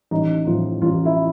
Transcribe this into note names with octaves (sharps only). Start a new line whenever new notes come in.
A1 D#4
A2 F3 F4
A1 F4
E4